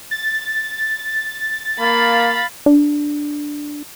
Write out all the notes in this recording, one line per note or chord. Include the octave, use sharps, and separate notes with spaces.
A6
A#3 F5 B5
D4